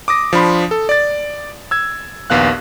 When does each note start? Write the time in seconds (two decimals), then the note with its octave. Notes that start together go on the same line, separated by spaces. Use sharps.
0.08 D6 D#6 A#6
0.33 F3 D4 B5 C6
0.71 A4
0.89 D5 A6
1.71 E6 G#6
2.30 A#1 D#2 B3 F5 F#6